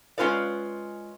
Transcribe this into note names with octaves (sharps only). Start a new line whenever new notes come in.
G#3 C#4 F4 B4 D5